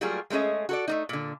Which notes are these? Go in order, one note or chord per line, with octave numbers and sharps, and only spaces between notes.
F#3 G3 A3 A#3 F4 G#4
G#3 A3 C#4 G#4 D#5
F#4 A4 D5
A3 A#3 D#4
A#2 D3